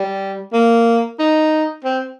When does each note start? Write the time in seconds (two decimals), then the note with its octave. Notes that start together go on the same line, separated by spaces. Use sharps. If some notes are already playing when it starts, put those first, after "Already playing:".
Already playing: G3
0.53 A#3
1.19 D#4
1.84 C4